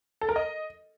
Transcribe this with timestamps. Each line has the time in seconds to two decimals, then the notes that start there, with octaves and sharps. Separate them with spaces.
0.21 A4
0.29 A#4
0.36 D#5